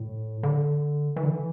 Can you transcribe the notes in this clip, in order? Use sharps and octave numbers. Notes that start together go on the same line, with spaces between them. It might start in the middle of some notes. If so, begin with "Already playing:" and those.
Already playing: A2
D3
E3
D3
E3